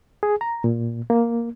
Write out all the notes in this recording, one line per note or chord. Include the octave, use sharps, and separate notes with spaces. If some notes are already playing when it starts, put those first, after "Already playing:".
G#4
A#5
A#2
A#3